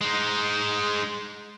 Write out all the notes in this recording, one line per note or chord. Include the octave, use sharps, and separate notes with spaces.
G#3 D#4